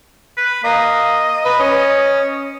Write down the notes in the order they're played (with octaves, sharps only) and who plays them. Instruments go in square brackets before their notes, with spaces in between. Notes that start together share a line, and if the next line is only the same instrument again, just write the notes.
[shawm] B4
[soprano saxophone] A#3 [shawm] D#5
[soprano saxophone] B4
C#4